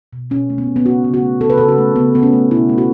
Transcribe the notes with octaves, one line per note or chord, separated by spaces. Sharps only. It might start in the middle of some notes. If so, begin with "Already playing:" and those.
B2
B2 C#4
A3
B3
B2
B3
C#3 F#4
C#3
F#4
A3
C#3 A4
B4
C#3 A4
F#4
A3
C#3 B3
C#3 B3
C#4
A3
B2 E4
A3
F#4